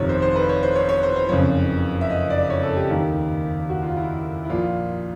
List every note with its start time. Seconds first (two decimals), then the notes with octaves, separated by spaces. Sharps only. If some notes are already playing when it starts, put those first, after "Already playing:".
Already playing: G1 F2 C3 D#3 C#5
0.09 C5
0.22 C5
0.36 B4
0.49 C#5
0.63 C5
0.76 C#5
0.89 C#5
1.03 C5
1.16 C5
1.29 F#1 F2 C#3 F3 C#5
2.01 E5
2.10 D#5
2.30 D5
2.50 C#5
2.63 A4
2.76 G4
2.90 D#2 D#3
3.69 F#4
3.82 F4
3.96 E4
4.45 E4
4.49 A#1 A#2 F3 F4